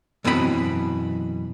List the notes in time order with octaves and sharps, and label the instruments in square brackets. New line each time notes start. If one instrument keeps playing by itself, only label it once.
[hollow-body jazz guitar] F#2 B2 E3 C4 A#4 B5